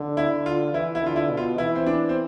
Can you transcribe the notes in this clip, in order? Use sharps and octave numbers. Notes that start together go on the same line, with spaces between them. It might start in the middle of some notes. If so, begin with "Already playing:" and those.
Already playing: D3
E4
D3
F4
E3 E4
E4
D3 F4
E4
B2
F4
E3 E4
C4
D4
C4